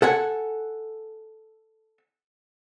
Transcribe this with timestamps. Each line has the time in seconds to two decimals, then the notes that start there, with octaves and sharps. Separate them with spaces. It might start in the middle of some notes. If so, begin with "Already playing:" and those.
0.02 A4 F#5 G#5